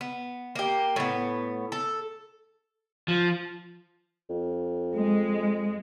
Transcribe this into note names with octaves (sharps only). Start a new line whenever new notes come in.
B3
A#3 G4
A2 B3
A4
F3
F2
G#3